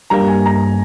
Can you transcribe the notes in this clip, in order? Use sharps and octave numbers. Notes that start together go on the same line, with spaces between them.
G2 G3 A#3 A#5
G#5
A#5